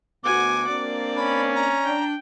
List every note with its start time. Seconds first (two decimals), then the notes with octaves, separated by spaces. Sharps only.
0.24 D2 B3 F#4 G#5 D6
0.69 A#3 C4 D4 D5
1.17 C#4 B5
1.55 A#5
1.85 D4 G5